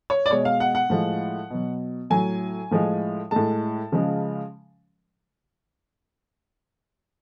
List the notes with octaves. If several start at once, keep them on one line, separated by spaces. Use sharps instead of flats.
C#5
D5
B2 G#3 C#5
F5
F#5
F#5
A2 F3 G#3
B2 F#3
A2 F#3 G#5
A2 F3 G#3
A2 G#3 A5
C#3 F3 G#3